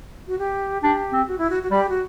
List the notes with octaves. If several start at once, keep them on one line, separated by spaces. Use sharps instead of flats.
F#4
G4
D4 G4
C4
F#4
E4
F#4
F#4
G3 G4
F#4